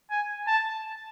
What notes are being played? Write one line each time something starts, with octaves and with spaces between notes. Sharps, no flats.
G#5
A5